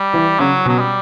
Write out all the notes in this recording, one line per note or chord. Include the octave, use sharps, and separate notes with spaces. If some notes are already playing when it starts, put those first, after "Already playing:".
Already playing: G3
E3
C#3 F#3
B2 F#3
G3